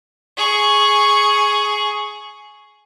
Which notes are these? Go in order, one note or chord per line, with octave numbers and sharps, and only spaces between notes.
G#4 C#6